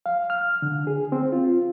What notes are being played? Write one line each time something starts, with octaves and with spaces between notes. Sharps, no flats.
F5
F6
D3
G#4
C4
F4